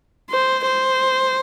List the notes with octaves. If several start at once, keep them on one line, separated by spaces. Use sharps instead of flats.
C5
C5